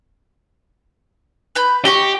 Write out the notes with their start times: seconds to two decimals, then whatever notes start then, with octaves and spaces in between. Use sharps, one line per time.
1.55 B4 B5 G6
1.85 G4 D#5 G5 C#6